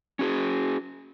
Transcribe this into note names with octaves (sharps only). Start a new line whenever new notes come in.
C#4 F#4 G#4